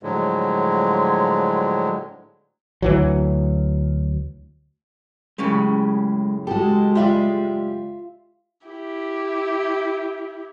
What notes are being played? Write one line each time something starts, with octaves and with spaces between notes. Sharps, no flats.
A2 D3 F3 F#3 G#3
D2 E3 F#3
F#2 A2 C#3 G#3 G4
G#3 F#4 G4 A4
F4 G4 D5 E5 F5 G5
E4 G4